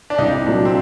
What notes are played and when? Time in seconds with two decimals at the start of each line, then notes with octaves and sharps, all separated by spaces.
0.10 D4
0.18 C2 D#4
0.46 A#2 F#3 A#3 D4
0.65 C4